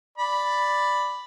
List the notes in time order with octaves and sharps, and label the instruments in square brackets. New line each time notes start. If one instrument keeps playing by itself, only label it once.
[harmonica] D5 B5